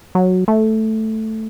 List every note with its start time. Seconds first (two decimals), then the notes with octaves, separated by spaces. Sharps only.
0.15 F#3
0.48 A3